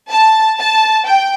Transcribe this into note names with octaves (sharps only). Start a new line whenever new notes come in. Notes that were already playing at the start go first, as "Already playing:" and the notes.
A5
A5
G5